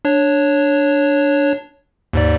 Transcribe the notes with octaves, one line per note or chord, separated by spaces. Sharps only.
D4 C#5
D#2 G#2 D5